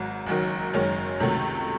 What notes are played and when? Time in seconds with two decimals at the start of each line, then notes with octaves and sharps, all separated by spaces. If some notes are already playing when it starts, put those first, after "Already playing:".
Already playing: G#1 G#2 F#3
0.26 F#1 F#2 D#3 F#3
0.73 F#1 F#2 D#3 G#3 C#4
1.20 C#2 C3 D#3 F#3 A3